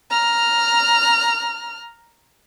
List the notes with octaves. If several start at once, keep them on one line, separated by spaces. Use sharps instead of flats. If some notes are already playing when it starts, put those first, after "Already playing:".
A#5 F6